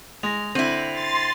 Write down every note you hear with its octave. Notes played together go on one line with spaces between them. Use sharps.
G#3 A#6 F7
D3 C4 E4 D#7 F#7
C6 A6